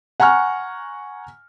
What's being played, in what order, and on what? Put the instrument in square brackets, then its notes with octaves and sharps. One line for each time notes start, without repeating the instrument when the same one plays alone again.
[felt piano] F#5 G#5 A#5 C#6 F6